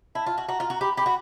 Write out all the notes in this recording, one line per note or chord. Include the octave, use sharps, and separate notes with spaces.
E4 A5
F4
F#4
F#4 A#5
F4
F#4
A#5
G4 B5
G4 B5
F#4